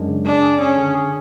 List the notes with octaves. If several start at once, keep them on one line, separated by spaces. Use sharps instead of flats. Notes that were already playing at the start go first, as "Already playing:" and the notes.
Already playing: F#2 G#3 D4
C#3
D4 G#4
G#4
C#4 G#4
D3
G#4